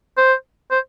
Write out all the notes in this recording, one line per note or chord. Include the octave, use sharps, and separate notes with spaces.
C5
C5